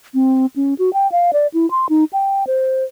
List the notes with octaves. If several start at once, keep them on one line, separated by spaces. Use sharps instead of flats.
C4
C#4
F#4
G5
F5
D5
E4
C6
D#4
G5
C5